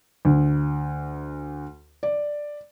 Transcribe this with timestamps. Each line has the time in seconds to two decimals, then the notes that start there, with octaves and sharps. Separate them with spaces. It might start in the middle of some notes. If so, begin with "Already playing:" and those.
0.25 D2
2.03 D5